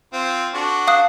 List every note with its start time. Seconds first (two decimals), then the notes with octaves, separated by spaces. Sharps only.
0.13 C4 F4
0.54 D4 F#4 A4
0.87 F5 D#6 F#6